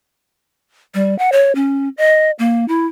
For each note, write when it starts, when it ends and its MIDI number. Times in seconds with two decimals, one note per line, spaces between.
0.94 1.17 55
1.19 1.32 78
1.32 1.55 73
1.55 1.89 61
1.97 2.31 75
2.39 2.67 58
2.68 2.87 64